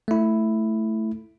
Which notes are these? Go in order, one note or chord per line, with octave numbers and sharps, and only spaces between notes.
A3 E4